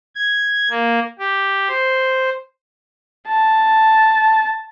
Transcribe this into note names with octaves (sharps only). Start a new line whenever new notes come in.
G#6
A#3
G4
C5
A5